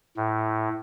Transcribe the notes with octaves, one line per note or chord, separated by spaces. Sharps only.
A2